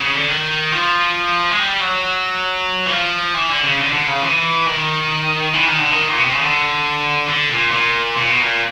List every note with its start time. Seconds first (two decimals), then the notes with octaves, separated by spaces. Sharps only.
0.01 C#3
0.14 D3
0.29 D#3
0.72 F3
1.51 G#3
1.60 G3
1.81 F#3
2.87 E3
2.91 F3
3.35 E3
3.50 D3
3.63 C#3
3.79 D3
3.93 D3
4.08 C#3
4.22 E3
4.66 D#3
5.54 E3
5.66 D#3
5.78 D3
5.91 D#3
6.09 A#2
6.18 B2
6.24 C3
6.33 C#3
6.41 D3
7.29 D3
7.50 A#2
7.72 A#2
8.17 A#2
8.29 B2
8.40 A#2